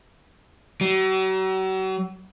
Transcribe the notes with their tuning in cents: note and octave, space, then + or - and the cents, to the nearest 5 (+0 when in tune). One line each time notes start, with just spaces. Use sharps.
F#3 +40